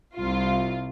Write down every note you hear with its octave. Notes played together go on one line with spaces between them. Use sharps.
C2 F4